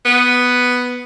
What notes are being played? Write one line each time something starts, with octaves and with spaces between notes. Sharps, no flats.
B3